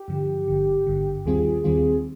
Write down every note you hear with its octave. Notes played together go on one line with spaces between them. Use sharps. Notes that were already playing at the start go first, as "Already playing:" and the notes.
Already playing: G4
G2 D3 F3
G#1 G2 D3
G#1 G2 D3
D#2 D#3 G3 C4 F4 G#4
D#2 D#3 G3 C4 F4